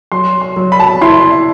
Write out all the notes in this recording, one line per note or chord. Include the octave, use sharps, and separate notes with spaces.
F#3 C6
C6
F#3
B5
A5
B5
E4 C6